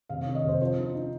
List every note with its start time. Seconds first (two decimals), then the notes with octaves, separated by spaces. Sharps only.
0.09 C3 F5
0.22 D#3 C#5
0.35 D#5
0.44 C3 C5
0.60 F3 C5
0.78 D#4
0.95 D#4